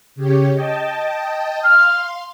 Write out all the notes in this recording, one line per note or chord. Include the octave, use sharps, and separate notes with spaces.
C#3 G4 C#5
D#5 G5 A5
F5 C6 F6